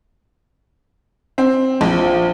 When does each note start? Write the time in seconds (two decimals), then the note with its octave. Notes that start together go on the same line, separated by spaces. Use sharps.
1.38 C4
1.81 A#1 F3